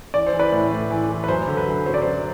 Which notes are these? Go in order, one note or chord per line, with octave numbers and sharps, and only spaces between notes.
E3 D5
C5
E3
B4 D5
A2
A2
E3
E3
B4
F#2 C5
D3
B4
F#2
F#3 C5
D5
F#2 C5